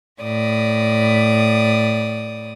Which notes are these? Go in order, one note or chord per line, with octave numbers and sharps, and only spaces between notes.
A2 D5 D#6